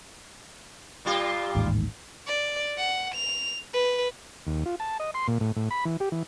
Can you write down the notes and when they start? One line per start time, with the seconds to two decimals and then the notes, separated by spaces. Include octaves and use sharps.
1.05 A#2 G3 F4
1.55 A1 D#2 G#2
2.27 D5
2.78 F#5
3.15 F7
3.73 B4
4.47 D#2
4.66 F4
4.80 A5
5.00 D#5
5.14 C6
5.28 A#2
5.41 A2
5.56 A2
5.71 B5
5.85 E3
6.00 G4
6.12 E3